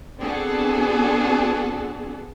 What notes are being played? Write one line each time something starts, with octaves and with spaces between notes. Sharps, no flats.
B3 C4 D4 F#4 G#4 A4